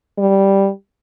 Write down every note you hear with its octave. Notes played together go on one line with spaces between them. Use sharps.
G3